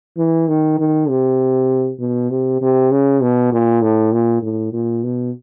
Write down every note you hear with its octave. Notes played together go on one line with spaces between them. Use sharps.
E3
D#3
D#3
C3
B2
C3
C3
C#3
B2
A#2
A2
A#2
A2
A#2
B2